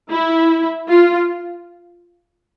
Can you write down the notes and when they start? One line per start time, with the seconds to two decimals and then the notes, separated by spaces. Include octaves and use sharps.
0.10 E4
0.88 F4